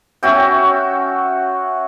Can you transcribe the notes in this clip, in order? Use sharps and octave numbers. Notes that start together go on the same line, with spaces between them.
C#4 F#4 E5 G5